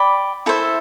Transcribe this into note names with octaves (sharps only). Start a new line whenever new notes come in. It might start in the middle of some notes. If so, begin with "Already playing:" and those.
Already playing: D5 G5 B5
E4 A4 C5 E5